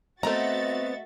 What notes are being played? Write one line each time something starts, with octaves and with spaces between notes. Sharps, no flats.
A3 B3 C4 F#4 D#5 E5 A#5 A6